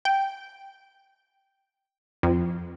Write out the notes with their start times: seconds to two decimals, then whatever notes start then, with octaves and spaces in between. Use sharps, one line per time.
0.05 G5
2.23 F2